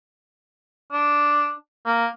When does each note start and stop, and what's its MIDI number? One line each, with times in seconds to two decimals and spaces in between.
0.92 1.52 62
1.86 2.07 58